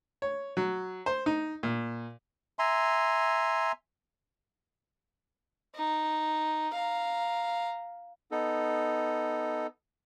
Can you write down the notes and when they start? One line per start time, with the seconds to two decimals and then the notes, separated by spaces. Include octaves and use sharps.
0.22 C#5
0.57 F#3
1.06 C5
1.26 D#4
1.63 A#2
2.59 E5 G#5 A#5 C6
5.75 D#4
6.74 F5 A#5
8.31 B3 D#4 A4